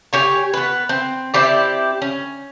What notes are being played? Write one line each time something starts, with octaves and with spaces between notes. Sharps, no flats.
G4 C#5 G#5
B3 B4
C4
C4 E4 G4 D5
C#4